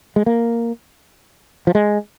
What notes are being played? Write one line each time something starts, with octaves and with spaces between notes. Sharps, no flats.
G#3
A#3
F3
G#3